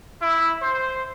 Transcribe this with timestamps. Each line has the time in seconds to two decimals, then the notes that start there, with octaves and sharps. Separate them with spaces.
0.21 E4
0.62 C5